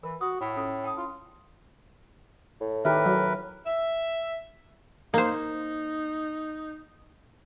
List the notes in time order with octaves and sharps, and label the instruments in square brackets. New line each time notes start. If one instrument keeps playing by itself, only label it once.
[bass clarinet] E3 [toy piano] A#4
[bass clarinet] F#4 [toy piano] D#6
[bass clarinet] A2
[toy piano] C#4 F4 A4
G5 A5 D#6
[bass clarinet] F4
[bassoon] A2
[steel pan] D#3 G4 [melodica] A#4 B4 [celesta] E5
[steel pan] F#3
[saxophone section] E5
[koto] A#3 C5 [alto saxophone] D#4